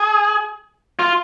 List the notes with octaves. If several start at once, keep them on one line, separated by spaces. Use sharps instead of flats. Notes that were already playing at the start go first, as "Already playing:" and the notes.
Already playing: G#4
F4